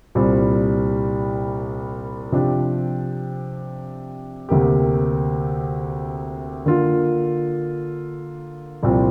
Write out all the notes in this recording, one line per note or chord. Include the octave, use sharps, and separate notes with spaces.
C2 A#2 G3 C4
C3 F3 D4 G4
D2 C3 A#3 G4
D3 A#3 F4
C2 A#2 F3 C4 G4